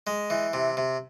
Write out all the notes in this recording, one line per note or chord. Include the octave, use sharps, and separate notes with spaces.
G#3
E3
C3
C3